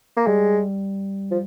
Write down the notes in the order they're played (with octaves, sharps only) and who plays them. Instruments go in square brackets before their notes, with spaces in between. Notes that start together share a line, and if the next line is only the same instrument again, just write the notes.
[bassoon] A#3
[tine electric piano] G3 [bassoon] G#3
[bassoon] F3